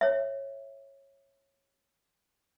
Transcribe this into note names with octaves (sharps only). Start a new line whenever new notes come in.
C#5 E5